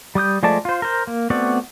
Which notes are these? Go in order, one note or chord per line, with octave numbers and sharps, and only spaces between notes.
G3 D6 D#6 G6
F3 G#3 A3 D5 A5
F4 C5
A#4 C5
A#3
A3 B3 C4 F#4 D5